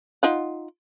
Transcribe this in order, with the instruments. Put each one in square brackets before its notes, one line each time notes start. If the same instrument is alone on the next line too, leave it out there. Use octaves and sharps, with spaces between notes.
[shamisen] D#4 F4 F#5